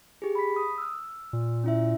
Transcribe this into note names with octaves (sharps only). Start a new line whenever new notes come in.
G4 G#4
B5 B6
D#6
E6 F6
A#2
C#4 E4 E5